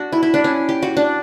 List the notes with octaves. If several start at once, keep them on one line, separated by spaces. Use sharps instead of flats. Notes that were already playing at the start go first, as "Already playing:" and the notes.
Already playing: D4 F#4
E4
E4
D4
C#4
G4
F#4
D4